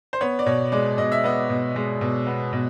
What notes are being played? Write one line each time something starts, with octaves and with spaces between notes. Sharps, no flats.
C5
B3 C#5
D5
B2 C#5
G#3 D5
B2 D#5
E5
B3 D#5
B2
G#3
B2
B3
B2